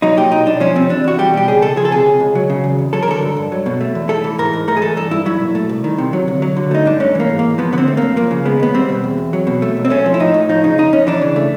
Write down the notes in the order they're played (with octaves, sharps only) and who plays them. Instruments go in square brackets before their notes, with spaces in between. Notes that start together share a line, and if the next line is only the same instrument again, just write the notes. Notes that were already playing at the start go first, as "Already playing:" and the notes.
[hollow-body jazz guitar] F#3 D#4
A#2 G4
B1 D#4
B1 D4
F3 C#4
C3 C4
E2 D4
E2 F#4
G3 G4
B2 G4
C#2 G#4
C#2 A4
F3 G#4
A4
C3 G#4
C#2
C#2
F#3
C#3
E2
E2
F#3 A4
A#4
D3 A4
G2
G2
F#3
B2
A3
E2
A3 A4
E3
G#2 A#4
G#2
A3 A#4
G#4
E3 A4
G2 A4
G2 E4
F#3 E4
A#2
A3
C2
D#3
C3
F#3
D2
F#3
D3
A3 D#4
G2 D4
A3 C#4
E3 A#3
G#2
A#3
G#2
F3 B3
D3 B3
C4
A3
F#2 A#3
F3 A#3
C#3
G#3 B3
D#2 B3
G3 C4
B2
E2
E2
F#3
B2
A3
B1
C4
A3 C#4
F3
E4
A2 D#4
A2
F3 D#4
C#3 D#4
F2 D#4
F2 C#4
E3 D4
C#3
A3